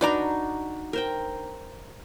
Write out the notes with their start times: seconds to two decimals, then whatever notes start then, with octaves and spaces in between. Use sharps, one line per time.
0.01 D4 D#4 F#4 B4 D5 A#5
0.93 A#4 C5 G5